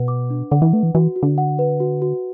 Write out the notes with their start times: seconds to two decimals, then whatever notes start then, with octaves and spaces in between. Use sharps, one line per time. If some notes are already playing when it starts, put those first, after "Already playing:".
Already playing: B2 B4 F#5
0.08 D6
0.30 D4
0.51 D3 F#5
0.62 E3
0.73 A3 B4
0.83 E3
0.95 E3 F#4
1.16 F#4
1.23 D3
1.38 F#5
1.59 B4
1.80 F#4
2.02 F#4